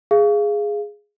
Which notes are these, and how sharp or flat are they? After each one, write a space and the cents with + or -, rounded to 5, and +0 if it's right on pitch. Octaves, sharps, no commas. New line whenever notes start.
G#4 +0 F5 -20